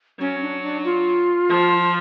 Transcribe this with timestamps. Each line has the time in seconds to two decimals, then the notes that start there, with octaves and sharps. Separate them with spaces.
0.20 F#3 C#4
0.42 D4
0.63 D4
0.85 F4
1.49 F3